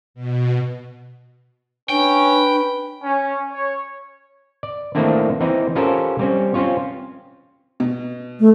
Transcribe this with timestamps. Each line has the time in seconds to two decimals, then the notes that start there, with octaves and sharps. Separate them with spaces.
0.14 B2
1.89 C#4 D4 B4 G5
3.03 C#4
3.52 C#5
4.63 D5
4.95 D#3 E3 A3 A#3 C4 D4
5.40 E3 C4 D#4
5.76 C#4 F4 G4 A4 A#4 C5
6.19 G3 C4 C#4
6.54 C4 C#4 F4 C#5
7.80 B2
8.40 A3